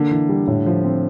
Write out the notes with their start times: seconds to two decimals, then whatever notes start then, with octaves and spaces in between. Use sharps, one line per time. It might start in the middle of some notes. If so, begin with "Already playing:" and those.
Already playing: D3 A#3
0.11 E3
0.29 G3
0.47 A2
0.66 F3
0.84 C4